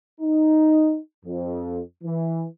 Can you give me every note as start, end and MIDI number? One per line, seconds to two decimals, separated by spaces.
0.21 0.99 63
1.25 1.80 41
2.04 2.46 52